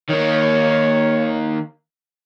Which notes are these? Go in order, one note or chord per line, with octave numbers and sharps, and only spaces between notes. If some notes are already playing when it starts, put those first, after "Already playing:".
D#3 A#3 C#5